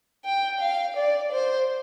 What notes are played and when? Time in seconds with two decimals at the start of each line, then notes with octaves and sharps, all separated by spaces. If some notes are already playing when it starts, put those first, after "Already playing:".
0.25 G5
0.60 F5
0.96 D5
1.32 C5